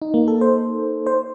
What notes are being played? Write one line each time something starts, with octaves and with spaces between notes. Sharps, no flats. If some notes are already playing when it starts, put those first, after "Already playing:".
D#4
A#3
A4
C5
C5